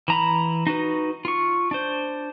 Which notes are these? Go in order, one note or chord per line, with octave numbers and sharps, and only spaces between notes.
E3 A#5 B5
D#4 F#4 B4
F4 C#6
D4 C5